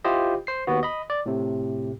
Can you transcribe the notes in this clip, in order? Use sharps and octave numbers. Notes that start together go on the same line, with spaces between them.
E4 F4 G4 C5 D#5
C5 C7
D#2 B3 F#4
D#5 B5
D5
A2 C3